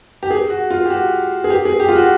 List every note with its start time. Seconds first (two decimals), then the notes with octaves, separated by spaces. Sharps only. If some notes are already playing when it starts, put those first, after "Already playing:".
0.23 G4
0.30 G#4
0.50 F#4
0.70 F4
0.86 G4
0.90 F#4
1.44 G#4
1.50 G4
1.65 G#4
1.80 G4
1.88 F4
1.95 F#4